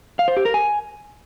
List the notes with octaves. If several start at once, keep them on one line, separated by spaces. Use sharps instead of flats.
F5
C5
G4
A#4
G#5